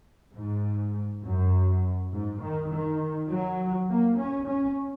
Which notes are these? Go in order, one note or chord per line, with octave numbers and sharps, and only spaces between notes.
G#2
F#2
G#2
D#3
D#3
F#3
A#3
C#4
C#4